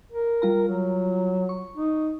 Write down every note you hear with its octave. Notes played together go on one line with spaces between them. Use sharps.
A#4
G3 F4 A#5
F#3
C#6
D#4